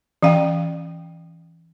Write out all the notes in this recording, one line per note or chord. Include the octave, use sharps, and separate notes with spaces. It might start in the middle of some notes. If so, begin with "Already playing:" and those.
E3 C#4 F5 G5